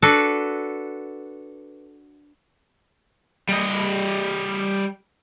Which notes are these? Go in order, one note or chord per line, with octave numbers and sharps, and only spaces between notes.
D4 F#4 A4 B4
G3 D#5